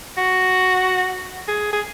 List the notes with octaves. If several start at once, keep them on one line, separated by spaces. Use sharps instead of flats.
F#4
G#4
G#4